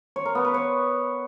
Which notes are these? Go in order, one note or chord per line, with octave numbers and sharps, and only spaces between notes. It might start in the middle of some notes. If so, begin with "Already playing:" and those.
C#5
A#4
B3
B4
C#5